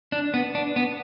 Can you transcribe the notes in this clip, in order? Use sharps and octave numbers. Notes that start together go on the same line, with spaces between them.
D4
B3
D4
B3